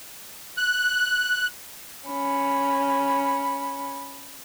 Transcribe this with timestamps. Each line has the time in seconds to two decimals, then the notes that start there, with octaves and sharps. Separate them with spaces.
0.57 F#6
2.09 C#4 B5